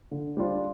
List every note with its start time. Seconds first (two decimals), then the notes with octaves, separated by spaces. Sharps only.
0.11 D3
0.37 G3 D4 F4 C5